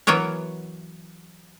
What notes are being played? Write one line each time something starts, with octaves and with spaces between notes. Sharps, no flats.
E3 F#3 B3 A#4 C#5